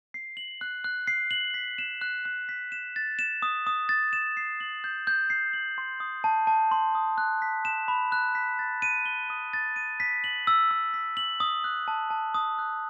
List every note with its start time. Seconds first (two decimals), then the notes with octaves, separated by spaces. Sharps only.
0.14 C7
0.37 F#7
0.61 F#6
0.84 F#6
1.07 C7
1.31 F#7
1.54 B6
1.78 E7
2.01 F#6
2.25 F#6
2.49 B6
2.72 E7
2.96 A6
3.19 E7
3.42 D#6
3.67 D#6
3.89 A6
4.13 E7
4.37 C7
4.60 F#7
4.84 G6
5.07 G6
5.30 C7
5.53 F#7
5.78 C6
6.00 D#6
6.24 A5
6.47 A5
6.71 C6
6.95 D#6
7.18 F#6
7.42 B6
7.65 E7
7.88 B5
8.12 F#6
8.35 B6
8.59 A6
8.82 D#7
9.06 G7
9.30 D#6
9.53 A6
9.76 D#7
10.00 B6
10.24 F#7
10.47 E6
10.71 E6
10.94 B6
11.17 F#7
11.40 D#6
11.64 F#6
11.88 A5
12.10 A5
12.35 D#6
12.59 F#6